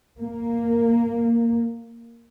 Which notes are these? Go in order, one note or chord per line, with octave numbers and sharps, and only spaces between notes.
A#3